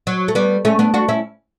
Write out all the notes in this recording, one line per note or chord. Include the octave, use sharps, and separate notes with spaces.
F#3
A3
G3 B3
A3 C#4
B3 D4
D4 F#4
C#4 E4